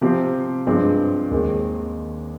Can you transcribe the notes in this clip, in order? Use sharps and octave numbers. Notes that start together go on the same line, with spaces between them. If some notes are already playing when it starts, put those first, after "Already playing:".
C3 F3 C4 G4
G2 F3 G#3 C4
D#2 D#3 G#3 C4